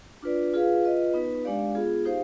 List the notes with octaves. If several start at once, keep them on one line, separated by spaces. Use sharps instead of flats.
D4 F4 B4 D5
F4 G#4 B4 F5
F4 B4 D#5
B3 D#4 B4
G#3 D4 G4 D5 F5
B3 F4 G#4
D#4 G4 C5 F5